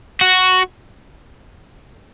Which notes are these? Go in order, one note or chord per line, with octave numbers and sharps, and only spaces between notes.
F#4